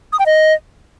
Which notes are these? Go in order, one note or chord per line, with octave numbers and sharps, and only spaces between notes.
D#6
G5
D#5